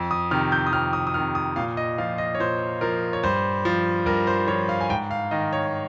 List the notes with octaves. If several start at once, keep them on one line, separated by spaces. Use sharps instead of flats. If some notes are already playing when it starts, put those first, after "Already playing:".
Already playing: F2
D#6
C3 D#3 F6
G6
D#6
F2 F6
D#6
D#6
C3 D#3 F6
D#6
A#2 F5
D#5
F3 F5
D#5
C#5
A#2 C5
F3 A#4
C#5
G2 C5
F3
G2 A#4
C5
F3 C#5
F5
G#5
G#2 G5
F5
D#3 D#5
C#5